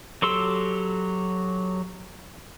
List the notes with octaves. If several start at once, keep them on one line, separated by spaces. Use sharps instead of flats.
F#3 G4 A4 C6 E6